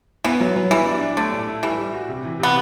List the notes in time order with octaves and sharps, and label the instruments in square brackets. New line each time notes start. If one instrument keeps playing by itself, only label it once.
[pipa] E3 [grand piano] B3
[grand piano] F#3
F#3
[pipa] E3 [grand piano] G3
[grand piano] D4
D4
[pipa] D3 [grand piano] A3
[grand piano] A2
E4
[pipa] E3 [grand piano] G3
[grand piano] G3
F#4
C3
E3
[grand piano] C3 [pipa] B3